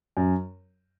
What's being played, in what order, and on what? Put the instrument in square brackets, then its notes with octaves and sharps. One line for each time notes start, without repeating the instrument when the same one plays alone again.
[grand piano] F#2